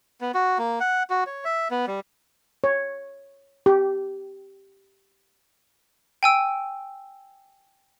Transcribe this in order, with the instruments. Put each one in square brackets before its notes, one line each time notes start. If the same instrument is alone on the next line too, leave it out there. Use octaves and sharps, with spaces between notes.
[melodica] B3
F#4
A#3
F#5
F#4
C#5
E5
B3
G3
[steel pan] C#5
G4
[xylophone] G5 G#5 E6 D7